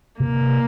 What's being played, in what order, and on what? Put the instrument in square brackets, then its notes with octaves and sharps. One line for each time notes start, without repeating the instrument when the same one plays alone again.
[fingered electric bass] C3 [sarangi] A#3